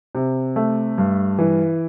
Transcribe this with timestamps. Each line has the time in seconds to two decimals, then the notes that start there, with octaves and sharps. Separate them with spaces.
0.15 C3
0.56 A3
0.98 G2
1.39 E3